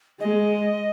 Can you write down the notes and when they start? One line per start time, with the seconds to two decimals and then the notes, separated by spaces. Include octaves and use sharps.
0.20 G#3 D#5